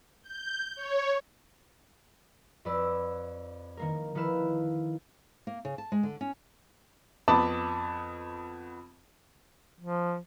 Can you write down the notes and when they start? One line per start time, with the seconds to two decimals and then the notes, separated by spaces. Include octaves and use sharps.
0.23 G6
0.76 C#5
2.65 F2 B4 D5 E6
3.77 D#3 A#3 A#4
4.15 D#3 F3 E4 B4 F6 E7
5.47 A#3
5.65 C#3
5.78 A5
5.92 G#3
6.03 D3
6.21 C#4
7.28 F2 B3 A5 B5 D6 D#6
9.80 F3